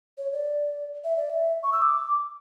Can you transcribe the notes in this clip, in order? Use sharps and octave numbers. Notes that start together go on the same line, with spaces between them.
C#5
D5
E5
D5
E5
C#6
E6
D6